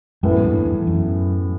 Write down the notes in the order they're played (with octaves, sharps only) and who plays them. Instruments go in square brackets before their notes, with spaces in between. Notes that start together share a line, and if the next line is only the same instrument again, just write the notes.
[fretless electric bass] F#2 [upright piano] A2 E3 B3 E4
[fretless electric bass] E2 G2
E2
F#2